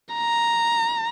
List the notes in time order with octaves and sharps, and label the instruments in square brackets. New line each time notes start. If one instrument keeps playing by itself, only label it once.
[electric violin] A#5